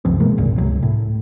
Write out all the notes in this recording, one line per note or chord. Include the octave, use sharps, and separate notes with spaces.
F#1 C#2 F3 C4
B2 E3 G#3 A#3
G1 C2 A#2
C#2 C3 F#3
A2